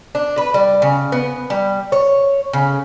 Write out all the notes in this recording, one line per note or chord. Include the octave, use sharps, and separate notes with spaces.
D4
B4
G3
C#3
B3
G3
C#5
C#3